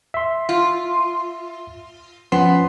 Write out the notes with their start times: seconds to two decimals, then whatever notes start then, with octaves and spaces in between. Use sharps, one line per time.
0.14 E5 C6
0.49 F4
2.32 F3 B3 C#4 C6